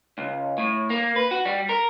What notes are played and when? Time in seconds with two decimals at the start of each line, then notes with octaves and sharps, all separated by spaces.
0.18 C#2
0.58 A2
0.90 A#3
1.16 B4
1.31 F#4
1.46 G3
1.69 A#4